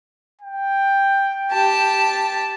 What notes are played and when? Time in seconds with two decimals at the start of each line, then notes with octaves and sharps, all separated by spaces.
0.41 G5
1.51 G4 A5